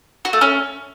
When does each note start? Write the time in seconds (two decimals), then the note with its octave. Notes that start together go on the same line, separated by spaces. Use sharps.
0.25 F#4
0.33 A3
0.41 C#4